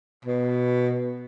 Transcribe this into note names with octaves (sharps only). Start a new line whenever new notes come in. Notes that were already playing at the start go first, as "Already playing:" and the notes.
B2